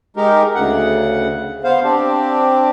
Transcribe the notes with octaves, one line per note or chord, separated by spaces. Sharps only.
G#3 D#4 G4 A#4
D2 C#3 F#5
B3 C5 F5
C4 D4 G4